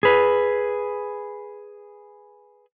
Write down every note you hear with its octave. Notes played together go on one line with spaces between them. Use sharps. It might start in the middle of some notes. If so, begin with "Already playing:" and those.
G#4 B4